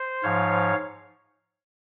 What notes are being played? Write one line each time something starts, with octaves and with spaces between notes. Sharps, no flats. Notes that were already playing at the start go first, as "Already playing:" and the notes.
Already playing: C5
G#2 F3 C#5 F5